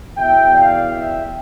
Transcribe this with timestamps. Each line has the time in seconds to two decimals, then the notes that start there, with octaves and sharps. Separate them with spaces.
0.17 E2 B2 E5 G5
0.53 D5 F5
0.90 E5 G5